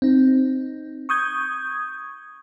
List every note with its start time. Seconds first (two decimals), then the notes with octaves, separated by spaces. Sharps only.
0.02 C4 D#4
1.09 C#6 D#6 G6 G#6